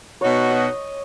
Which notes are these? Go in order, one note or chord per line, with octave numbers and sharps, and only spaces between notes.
B2 B3 D#4 F#4 C#5
D#5